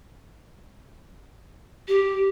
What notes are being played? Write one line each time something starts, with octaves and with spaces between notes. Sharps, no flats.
G4